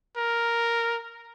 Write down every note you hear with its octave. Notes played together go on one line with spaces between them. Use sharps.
A#4